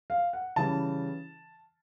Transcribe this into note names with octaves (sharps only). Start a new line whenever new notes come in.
F5
F#5
C#3 E3 G3 A5